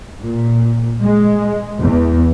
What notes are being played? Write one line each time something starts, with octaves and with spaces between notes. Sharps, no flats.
A#2
G#3
E2